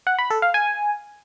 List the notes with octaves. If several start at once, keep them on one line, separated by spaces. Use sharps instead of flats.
F#5
B5
A4
F5
G#5